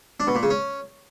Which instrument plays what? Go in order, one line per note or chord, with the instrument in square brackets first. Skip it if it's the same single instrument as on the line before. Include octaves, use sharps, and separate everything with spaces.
[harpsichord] D4
B2
A#2
C#3
C#4